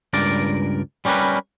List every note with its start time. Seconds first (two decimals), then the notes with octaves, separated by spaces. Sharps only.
0.13 C#2 G2 A#4 D5
1.05 G3 C#4 G4 A#4 B4